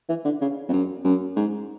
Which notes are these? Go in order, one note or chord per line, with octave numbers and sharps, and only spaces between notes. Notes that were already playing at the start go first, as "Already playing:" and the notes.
E3
D3
C#3
F2
F#2
F#2
G#2